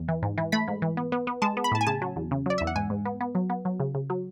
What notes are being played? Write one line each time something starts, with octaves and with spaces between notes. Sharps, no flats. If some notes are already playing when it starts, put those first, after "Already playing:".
Already playing: E2
E3
G#2
E3
A3 B5
G#2
E3
B3
B3
B3
G#3 A5
B3
B5
A2 A5
G#5
C#3 A5
F#3
E2
C#3
F#3 D5
E2 E5
F#5
G#2 G#5
G#2
B3
B3
F#3
B3
F#3
C#3
C#3
F#3